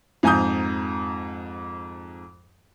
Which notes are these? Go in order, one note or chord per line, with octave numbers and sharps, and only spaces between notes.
F2 G#2 G#5 A#5 D#6 G6